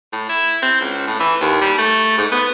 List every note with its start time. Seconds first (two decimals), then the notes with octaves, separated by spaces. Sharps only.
0.13 A2
0.30 E4
0.63 C4
0.81 C#2
1.07 A2
1.20 E3
1.41 D#2
1.62 G3
1.78 A3
2.18 G#2
2.32 B3